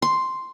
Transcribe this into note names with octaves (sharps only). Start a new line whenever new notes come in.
C6